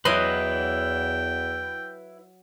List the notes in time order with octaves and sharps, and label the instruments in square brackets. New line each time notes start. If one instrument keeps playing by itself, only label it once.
[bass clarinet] E2 [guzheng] F#3 D#5 C6 [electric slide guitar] E4 B4 [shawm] G5